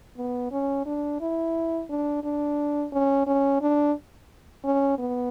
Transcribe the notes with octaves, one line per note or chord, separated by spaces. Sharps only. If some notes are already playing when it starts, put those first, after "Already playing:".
B3
C#4
D4
E4
D4
D4
C#4
C#4
D4
C#4
B3